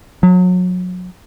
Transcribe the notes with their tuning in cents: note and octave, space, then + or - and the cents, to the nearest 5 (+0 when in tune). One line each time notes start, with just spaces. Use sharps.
F#3 -30